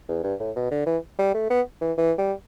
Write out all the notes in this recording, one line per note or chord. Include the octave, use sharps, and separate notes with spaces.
E2
G2
A2
B2
D3
E3
G3
A3
B3
E3
E3
G3